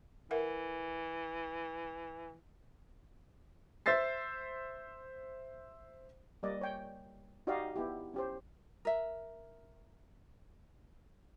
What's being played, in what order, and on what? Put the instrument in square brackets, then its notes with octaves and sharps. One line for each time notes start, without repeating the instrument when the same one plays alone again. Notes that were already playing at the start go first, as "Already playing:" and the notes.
[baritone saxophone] E3 [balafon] A#4 E5 F#5
[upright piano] C5 E5 E6 A6 C7
[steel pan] G3 A#3 D5 D#5
C#5 G5
D#4 F#4 G4 D5 D#5 F5
B3 E4 G4
C#4 G4 C5
[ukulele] A#4 E5